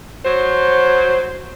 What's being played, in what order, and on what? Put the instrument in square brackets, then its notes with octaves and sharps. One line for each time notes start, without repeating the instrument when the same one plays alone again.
[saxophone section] F#3 C5